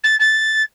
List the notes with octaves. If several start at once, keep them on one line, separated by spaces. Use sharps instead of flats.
A6
A6